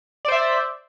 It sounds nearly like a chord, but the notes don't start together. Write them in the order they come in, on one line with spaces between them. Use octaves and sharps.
D5 C5 E5